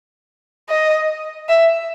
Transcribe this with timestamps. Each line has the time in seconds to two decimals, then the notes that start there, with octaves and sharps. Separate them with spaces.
0.70 D#5
1.49 E5